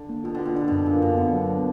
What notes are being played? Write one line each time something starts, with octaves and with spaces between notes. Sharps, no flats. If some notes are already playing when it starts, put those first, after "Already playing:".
Already playing: D3
A#3
B2 F4
D3
F4
B2
D3 D4
F#2 B2
F#2 A#2
B2 D4
D3 B3
F#3